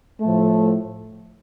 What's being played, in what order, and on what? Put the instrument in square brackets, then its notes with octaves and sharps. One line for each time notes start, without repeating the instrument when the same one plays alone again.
[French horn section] A2 F3 A3